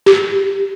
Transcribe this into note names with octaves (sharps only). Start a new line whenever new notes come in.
G4